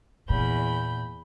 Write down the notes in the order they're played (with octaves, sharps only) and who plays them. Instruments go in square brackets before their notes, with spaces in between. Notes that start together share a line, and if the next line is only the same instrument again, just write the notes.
[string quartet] E2 B5 G6 [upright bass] A#2